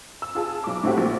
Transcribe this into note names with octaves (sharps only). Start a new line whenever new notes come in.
E6
F4 G#4 A5
B1 D6
A2 A3 C4 E4 F#4 G4
A#1